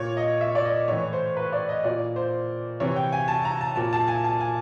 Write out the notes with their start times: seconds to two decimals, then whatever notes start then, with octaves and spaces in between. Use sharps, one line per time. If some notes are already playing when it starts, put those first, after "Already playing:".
Already playing: A#2 C#5
0.17 D#5
0.41 E5
0.55 D5
0.65 D#5
0.88 A2 E3 C#5
1.13 C5
1.37 B4
1.53 D5
1.69 D#5
1.84 A#2 D5
2.16 C5
2.80 C3 E3 C#5
2.96 G5
3.12 G#5
3.28 A5
3.45 A#5
3.61 A5
3.76 A#2 A5
3.93 A5
4.08 G#5
4.24 A5
4.40 G#5